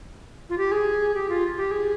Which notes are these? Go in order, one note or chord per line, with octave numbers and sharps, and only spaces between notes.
F4
G4
G#4
G4
F4
G4
G#4